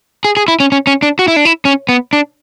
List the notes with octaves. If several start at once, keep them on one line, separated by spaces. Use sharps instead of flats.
G#4
G#4
E4
C#4
C#4
C#4
D4
F#4
E4
D4
E4
C#4
B3
D4